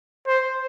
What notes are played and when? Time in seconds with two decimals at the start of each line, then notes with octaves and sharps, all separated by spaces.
0.27 C5